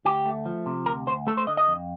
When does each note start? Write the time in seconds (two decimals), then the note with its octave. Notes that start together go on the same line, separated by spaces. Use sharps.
0.05 D2 G4
0.26 A3
0.46 F3
0.66 C3
0.86 D2 A#4
1.07 D2 C5
1.27 A3 A4
1.37 C5
1.47 D3 D#5
1.57 D#5
1.68 F2